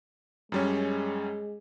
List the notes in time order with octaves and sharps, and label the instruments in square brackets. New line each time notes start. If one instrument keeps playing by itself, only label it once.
[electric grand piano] F#2 G3 C#4 [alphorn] G#3